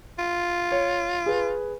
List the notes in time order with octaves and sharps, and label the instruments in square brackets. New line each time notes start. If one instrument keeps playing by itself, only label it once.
[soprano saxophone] F4
[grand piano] C#5
G#4 B4